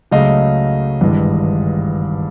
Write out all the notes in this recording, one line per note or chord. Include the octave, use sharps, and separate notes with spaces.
C#2 C#3 F#3 A3 D#5 F5
G#1 G2 E3 G#3